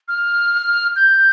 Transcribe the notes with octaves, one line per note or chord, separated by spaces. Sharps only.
F6
G6